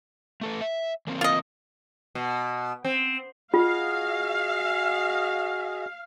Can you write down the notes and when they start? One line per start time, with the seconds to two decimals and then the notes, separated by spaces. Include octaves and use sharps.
0.41 A3 A4 B4
0.61 E5
1.07 E3 A#3 C4
1.21 F4 D#5
2.15 B2
2.85 C4
3.54 F4 F#4 G#4 D#5 F5